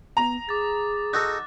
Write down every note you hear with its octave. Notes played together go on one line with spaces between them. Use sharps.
B3 A#5
G#4 D6 A6
D#4 F#4 A4 F#6